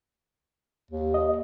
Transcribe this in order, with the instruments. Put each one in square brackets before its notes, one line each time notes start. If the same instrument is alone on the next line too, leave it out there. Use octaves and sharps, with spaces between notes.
[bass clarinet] D#2
[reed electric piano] D#5